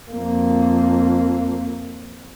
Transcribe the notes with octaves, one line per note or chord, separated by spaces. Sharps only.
F2 A#3